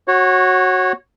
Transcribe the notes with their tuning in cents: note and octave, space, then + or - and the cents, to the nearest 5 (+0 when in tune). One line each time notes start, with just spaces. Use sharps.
F#4 +0 C#5 -20